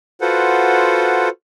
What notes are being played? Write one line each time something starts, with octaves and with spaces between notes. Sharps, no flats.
F4 F#4 A4 B4 C5 F#5